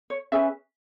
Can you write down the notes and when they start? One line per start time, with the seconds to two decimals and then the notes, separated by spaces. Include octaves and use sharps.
0.10 C#5
0.32 C#4 G#4 B4 E5 G#5